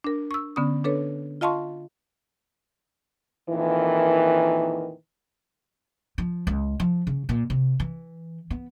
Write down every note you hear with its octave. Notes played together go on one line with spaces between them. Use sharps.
D4 A#4
C#6 E6
D3 B3 C#4 D#6
D4 A4 B4 C#5
F4 D#5 F5 A5 C6 C#6
F2 A#2 D#3 E3
F3
C#2
F3
C#3
A#2
C3
E3
B3